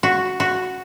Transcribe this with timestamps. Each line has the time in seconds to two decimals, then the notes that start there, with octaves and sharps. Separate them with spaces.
0.03 F#4
0.40 F#4